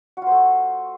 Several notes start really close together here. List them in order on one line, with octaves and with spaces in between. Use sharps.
F#4 F4 C5 A3